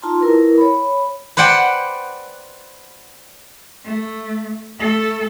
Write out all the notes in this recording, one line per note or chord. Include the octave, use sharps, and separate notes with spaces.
D#4 F4 A5 A#5 C6
E4 A#4 B4
C#5 B5
B4 C5 D5 F#5 G5
A3
A3 A4